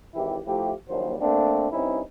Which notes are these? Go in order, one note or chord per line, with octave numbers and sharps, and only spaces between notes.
G#1 E3 E4 G4
F3 A3 E4 G4
A#1 D#2 F#3 G3 C5
A3 A#3 C4 D4
G2 C4 C#4 D#4 E4